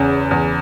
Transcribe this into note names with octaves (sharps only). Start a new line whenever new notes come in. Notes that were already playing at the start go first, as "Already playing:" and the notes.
Already playing: E2 C#3
E2